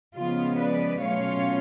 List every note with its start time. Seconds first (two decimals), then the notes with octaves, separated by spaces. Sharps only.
0.15 C#3 F3 G#3 B3 F4
0.58 B4 D5
1.01 B2 F#3 A3 C#4 F4 C#5 F5